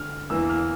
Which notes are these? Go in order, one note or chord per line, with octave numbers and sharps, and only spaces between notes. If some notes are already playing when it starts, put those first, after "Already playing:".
Already playing: D3 F6
E2 E3 A#3 E6
F6